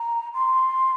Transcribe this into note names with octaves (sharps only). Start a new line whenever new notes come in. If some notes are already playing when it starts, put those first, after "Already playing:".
Already playing: A#5
C6